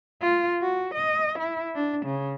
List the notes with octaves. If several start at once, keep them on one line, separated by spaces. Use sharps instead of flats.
F4
F#4
D#5
E4
D4
C#3